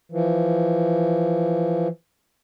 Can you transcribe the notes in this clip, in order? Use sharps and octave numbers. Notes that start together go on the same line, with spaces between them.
E3 F3